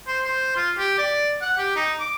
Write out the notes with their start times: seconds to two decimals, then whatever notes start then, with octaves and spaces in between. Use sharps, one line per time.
0.07 C5
0.25 C5
0.57 F4
0.78 G4
0.98 D5
1.42 F#5
1.58 G4
1.76 D#4
2.00 D6